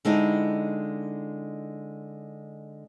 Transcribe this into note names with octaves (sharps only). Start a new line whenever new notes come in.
D3 G#3 C4 D#4 E4